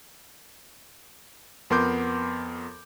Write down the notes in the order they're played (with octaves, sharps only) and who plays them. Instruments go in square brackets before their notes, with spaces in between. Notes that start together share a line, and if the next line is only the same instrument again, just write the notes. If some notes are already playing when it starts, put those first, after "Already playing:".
[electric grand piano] F2 B3 A#4 C6 D6 G6